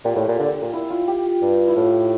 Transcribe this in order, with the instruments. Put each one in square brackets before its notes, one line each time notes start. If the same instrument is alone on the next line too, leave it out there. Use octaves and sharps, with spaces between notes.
[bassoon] A#2 [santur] G4
[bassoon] A2
A#2
D3
A#2
[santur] E4
F4
G4
[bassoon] G2
[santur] E4
[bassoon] A2 [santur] F4